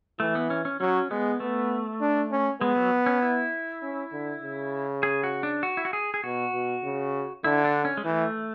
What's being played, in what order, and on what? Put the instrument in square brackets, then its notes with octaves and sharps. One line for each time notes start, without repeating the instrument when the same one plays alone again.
[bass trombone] E3 [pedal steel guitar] A3
[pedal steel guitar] B3
C#4
C#4
[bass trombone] F#3 [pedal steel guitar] C#4
[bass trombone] G#3 [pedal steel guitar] B3
[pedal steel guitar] A3 [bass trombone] B3
[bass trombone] D4
C#4
[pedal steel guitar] G#3 [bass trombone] B3
[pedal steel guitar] F#3
C#4
E4
[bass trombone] C#4
D3
C#3
[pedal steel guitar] G#4
F#4
D4
F#4
E4
F#4
G#4
G#4
[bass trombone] B2 [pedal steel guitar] F#4
[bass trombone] B2
C#3
[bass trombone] D3 [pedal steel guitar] E4
[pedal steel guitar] D4
C#4
G#3
[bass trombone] E3 [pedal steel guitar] A3